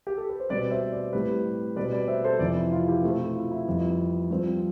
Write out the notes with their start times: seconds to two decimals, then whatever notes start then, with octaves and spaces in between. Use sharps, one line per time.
0.07 G4
0.17 A4
0.29 B4
0.40 C5
0.49 B2 G3 C4 B4 D5
0.71 C5 E5
0.92 B4 D5
1.13 A2 G3 C4 G4 B4
1.76 B2 G3 C4 B4 D5
1.92 B4 D5
2.08 C5 E5
2.24 A4 C5
2.39 F2 C3 E3 B3 B4 D5
2.56 E4
2.72 F4
2.87 E4 G4
3.03 B2 A3 C4 F4
3.20 E4
3.35 F4
3.51 E4
3.67 F2 E3 G3 B3
4.30 G2 F3 C4